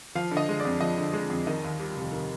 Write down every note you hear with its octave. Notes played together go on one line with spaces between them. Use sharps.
F3 F5
D3
D#5
G#3
D5
F2
F3 D#5
D3
G#3
F2
D#3 D#5
D#2
G3
F1
D#3